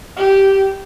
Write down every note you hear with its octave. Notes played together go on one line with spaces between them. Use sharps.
G4